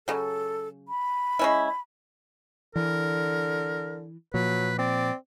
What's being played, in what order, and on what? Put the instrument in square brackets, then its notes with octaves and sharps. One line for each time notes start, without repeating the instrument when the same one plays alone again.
[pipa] C#3 F#3 [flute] A4
[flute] B5
[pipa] G#3 C#4 E4
[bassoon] D3 [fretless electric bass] E3 [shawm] A#4
[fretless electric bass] A#2 F3 [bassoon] F#3 [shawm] B4
[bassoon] C4 [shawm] D5